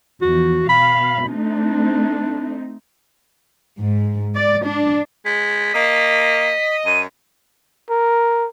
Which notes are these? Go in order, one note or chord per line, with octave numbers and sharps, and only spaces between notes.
E2 F3 F#4
B2 F5 B5
A3 C4 D4 D#4
G#2
D5
D4
G#3 B6
A#3 D#5
F#2 D#7
A#4